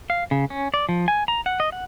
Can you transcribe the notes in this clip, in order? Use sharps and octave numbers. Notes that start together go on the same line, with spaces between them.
F5
C#3
C#4
D5
F3
G#5
A#5
F#5
D#5
F#5